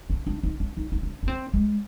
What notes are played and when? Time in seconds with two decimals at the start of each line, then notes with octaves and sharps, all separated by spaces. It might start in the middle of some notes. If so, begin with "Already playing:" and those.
0.10 D4
0.26 D4
0.43 D#4
0.60 D4
0.77 D#4
0.92 D#4
1.03 D4
1.23 D4
1.28 C4
1.54 G#3